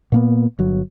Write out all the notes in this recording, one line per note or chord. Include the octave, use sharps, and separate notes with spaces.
A#2 A#3 B3
G1 F#3